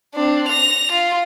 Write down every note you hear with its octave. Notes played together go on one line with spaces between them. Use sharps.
C4 D4
A#6 F7
F4